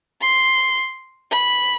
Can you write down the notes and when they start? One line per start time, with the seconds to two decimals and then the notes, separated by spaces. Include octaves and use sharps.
0.22 C6
1.32 B5